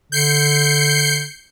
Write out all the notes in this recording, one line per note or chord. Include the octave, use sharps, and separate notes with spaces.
D3 G6 C7 C#7